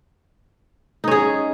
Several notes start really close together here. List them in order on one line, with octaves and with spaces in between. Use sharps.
D#4 C#4 G#4